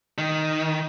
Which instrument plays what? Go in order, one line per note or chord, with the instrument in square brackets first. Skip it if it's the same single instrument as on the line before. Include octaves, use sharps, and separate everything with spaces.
[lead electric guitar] D#3